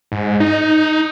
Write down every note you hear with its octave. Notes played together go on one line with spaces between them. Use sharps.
G#2
D#4